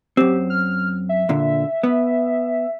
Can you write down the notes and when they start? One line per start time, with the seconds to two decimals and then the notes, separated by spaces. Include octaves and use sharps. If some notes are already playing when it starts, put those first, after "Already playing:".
0.17 F#2 C4 G4
0.50 F6
1.09 E5
1.29 A#2 D3
1.83 B3